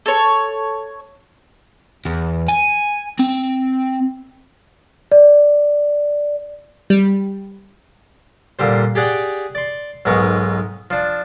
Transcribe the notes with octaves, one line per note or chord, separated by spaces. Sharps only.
A4 C#5
E2
G#5
C4
D5
G3
A#2 D3 G3 C5
G4 G#4 D5 F#5 G5
D5 C6
B1 G#2 B3 A#4 C#6
F3 D4